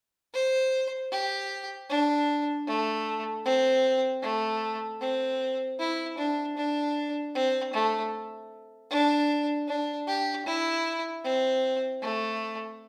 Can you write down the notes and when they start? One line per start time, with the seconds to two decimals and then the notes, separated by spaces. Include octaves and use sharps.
0.34 C5
1.12 G4
1.90 D4
2.67 A3
3.45 C4
4.23 A3
5.01 C4
5.79 E4
6.18 D4
6.57 D4
7.35 C4
7.74 A3
8.91 D4
9.68 D4
10.08 G4
10.46 E4
11.24 C4
12.02 A3